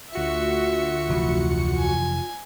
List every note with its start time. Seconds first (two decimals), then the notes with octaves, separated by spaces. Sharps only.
0.13 D2 F4 F#4 E5 C#7
1.09 F1 E3
1.80 G#5